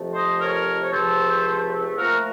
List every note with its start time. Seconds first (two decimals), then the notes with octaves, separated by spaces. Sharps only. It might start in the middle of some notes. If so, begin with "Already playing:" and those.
Already playing: F2 C3 F3 A3
0.13 C5 D#5
0.39 A#4 C#5
0.80 C#5
0.92 C#2 C3 F3 A3 A4 C5
1.96 A#2 F3 A3 F#4 A#4